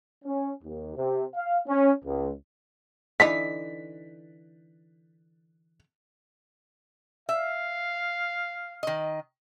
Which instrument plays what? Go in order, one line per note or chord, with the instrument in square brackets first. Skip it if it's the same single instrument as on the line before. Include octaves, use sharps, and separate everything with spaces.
[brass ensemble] C#4
D#2
C3
F5
C#4
C#2
[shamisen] D3 E3 D#4 [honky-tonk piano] B6
[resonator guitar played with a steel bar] E5 [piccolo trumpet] F5
[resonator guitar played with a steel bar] D#3 D#5